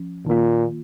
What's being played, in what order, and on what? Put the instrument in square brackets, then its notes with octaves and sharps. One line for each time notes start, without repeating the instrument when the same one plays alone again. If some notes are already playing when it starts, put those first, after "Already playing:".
Already playing: [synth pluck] F3 C#4
[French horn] A#2 [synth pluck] D#3 A#3 F4